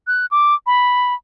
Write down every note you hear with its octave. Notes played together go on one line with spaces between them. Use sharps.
F#6
D6
B5